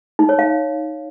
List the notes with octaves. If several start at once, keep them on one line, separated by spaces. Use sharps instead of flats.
D#4
C#5
F5